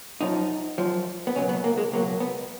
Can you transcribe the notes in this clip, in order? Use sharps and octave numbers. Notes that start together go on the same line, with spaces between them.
F#2 F3 D#4
F#2 F3
B3
C#2 B2 F#3 C#4
B3
A#3
G#3
C#2 B2 F#3 A#3
B3